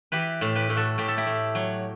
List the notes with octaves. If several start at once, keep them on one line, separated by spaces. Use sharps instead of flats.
E3 G4 B4
A2
G4 B4
A2
F#4 A4
A2 G4
A4
E4 G4
A2
F#3